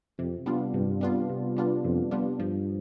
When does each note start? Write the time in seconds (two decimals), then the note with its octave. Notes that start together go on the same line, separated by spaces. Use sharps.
0.18 F2 C3
0.46 G3 B3 D4 F4
0.74 G2 C3
1.01 G3 B3 D4 F4
1.30 C3
1.56 G3 B3 D4 F4
1.84 F2 C3
2.11 G3 B3 D4 F4
2.39 G2 F3